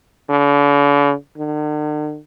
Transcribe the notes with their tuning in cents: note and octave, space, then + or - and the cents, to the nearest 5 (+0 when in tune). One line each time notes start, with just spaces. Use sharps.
D3 -40
D3 +45